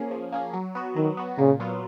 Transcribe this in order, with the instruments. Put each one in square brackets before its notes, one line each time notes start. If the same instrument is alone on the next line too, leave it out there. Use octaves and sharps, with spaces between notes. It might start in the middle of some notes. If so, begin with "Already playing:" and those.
Already playing: [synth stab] F3 A#3 C#4 G#4
F3
A#3 C#4 G#4
F#3
B3 F#4
[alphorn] D#3 [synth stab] F#3
[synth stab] B3 F#4
[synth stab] A#2 [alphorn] C#3
[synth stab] F#3 B3 F4